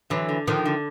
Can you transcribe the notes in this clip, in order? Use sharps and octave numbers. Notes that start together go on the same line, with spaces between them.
D3 E3 F#3
D3
D3 D#3 F3
D3